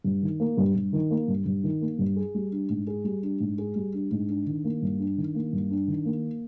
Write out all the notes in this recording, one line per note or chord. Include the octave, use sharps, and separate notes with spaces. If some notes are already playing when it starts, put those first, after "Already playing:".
G2
D#3
A#3
G2
G2
D#3
A#3
G2
G2
D#3
A#3
G2
G#4
G3
D4
G#2
G#4
G3
D4
G#2
G#4
G3
D4
G#2
D4
D#3
A#3
G2
D4
D#3
A#3
G2
D4
D#3
A#3